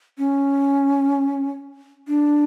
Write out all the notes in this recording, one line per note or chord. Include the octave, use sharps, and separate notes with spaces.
C#4
D4